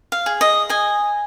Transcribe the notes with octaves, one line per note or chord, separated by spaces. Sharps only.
F5
G#4
D#5
D#5 G#5